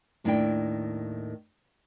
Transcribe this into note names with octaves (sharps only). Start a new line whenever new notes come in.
D#2 A2 D#3 D4 E4 G5